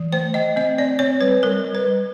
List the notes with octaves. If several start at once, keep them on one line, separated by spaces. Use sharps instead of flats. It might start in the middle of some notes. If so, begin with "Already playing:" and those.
Already playing: E3
A3 C5
A3 D#5
C4 D#5
C4 D5
C4 C#5
G3 B4
G3 A#4
G3
B4
G3